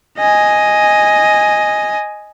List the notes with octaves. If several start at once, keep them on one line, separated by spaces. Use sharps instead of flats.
D#5 G#5